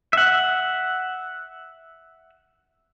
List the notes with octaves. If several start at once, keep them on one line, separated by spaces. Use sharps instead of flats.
E5 F#5